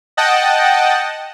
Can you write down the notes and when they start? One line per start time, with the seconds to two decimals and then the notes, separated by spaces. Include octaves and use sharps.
0.17 D#5 F#5 G5 A5